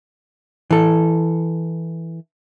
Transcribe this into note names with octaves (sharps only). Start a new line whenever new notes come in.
E3 A4